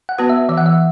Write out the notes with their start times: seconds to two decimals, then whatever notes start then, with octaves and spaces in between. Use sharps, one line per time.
0.09 F#5
0.18 B3 F#4 B4
0.29 E5
0.49 E3 E5
0.57 F#5
0.66 E5